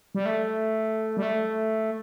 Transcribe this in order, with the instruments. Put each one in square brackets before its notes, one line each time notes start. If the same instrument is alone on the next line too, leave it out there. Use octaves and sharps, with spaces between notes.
[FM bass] G3
A3
G3
A3